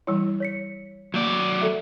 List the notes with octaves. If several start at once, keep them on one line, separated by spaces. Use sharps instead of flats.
E3 G3 E4 C#5
C#5 B6 C#7
F#3 A#3 D5
A4 E5